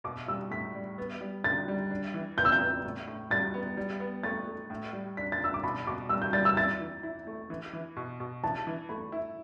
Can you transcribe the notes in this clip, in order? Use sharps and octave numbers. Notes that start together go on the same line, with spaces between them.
B2 D6
G3 E6
A2 B6
G3
B3
G3
D3 A6
G3
D4
E3
B3 G6
E6
G6
B3
A2
A2
G3 A6
B3
G3
B3
A3 A6
A3
A2
G3
D4 B6
A6
D4 E6
D6
B2 B5
B2 D6
G3 E6
G6
G3 A6
E6
E4 A6
E3
E4
A3
E3
E3
B2
B2
E3 A5
E3
A3 B5
E4